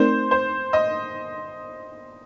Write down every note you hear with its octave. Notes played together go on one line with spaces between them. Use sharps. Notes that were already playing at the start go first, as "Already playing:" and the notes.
Already playing: A3 C4 D#4 A#4 C5 D5
C5
D#5